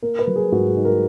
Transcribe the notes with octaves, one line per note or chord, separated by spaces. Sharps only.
A#3 A#4
B4
F#3
G#4
G#2 F#4
G#4
D#4
A#4